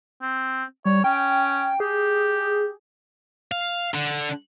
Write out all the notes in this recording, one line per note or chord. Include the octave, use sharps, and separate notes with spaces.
C4
G3 C#5
C#4 G5
G4 G#4
F5
D3